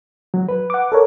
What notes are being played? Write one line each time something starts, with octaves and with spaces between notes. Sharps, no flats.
F#3
B4
F#5 D6
A4 A#4 C#5